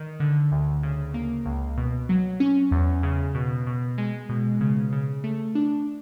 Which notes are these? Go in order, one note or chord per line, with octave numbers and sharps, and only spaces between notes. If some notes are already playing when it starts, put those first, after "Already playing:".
Already playing: D#3
D3
D2
C#3
A#3
C#2
B2
F#3
C#4
E2
C#3
B2
B2
G#3
B2
C#3
C#3
A3
D4